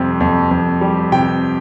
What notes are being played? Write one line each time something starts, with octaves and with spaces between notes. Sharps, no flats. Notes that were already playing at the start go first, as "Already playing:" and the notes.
Already playing: F2 C3 G3
F2
F2
G3
C3 G5